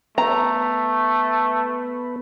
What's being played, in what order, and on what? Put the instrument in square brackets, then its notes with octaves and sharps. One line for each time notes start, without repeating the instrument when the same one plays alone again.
[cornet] A3 [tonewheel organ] B3 B4 [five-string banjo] A#5